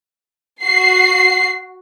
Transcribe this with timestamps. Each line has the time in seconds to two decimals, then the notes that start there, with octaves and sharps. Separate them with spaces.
0.63 F#4 C7